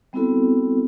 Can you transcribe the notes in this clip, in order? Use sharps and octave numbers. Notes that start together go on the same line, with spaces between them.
G3 B3 C4 E4 F#4 A4